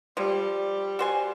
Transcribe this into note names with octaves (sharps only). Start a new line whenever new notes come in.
F3 G3
F#4 C5 G#5